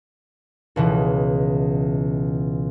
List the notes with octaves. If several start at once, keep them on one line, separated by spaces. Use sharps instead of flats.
C#2 B2 E3